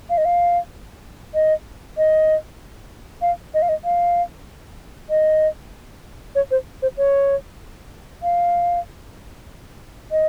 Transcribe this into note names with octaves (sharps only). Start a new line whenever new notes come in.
F5
D#5
F5
D#5
D#5
F5
D#5
F5
D#5
F5
D#5
C#5
C5
C5
C#5
F5
D#5